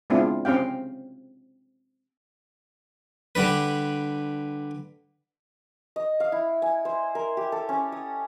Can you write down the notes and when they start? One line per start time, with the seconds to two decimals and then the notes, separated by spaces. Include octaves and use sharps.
0.10 G#3 B3 C4 D4 E4 F4
0.45 C4 C#4 G4 F5 G5
3.35 D3 G3 D4 B4
5.96 D#5
6.20 F5
6.32 E4
6.62 G#5
6.85 C5
7.15 A#4
7.37 G4
7.52 A4
7.69 C#4
7.92 D#6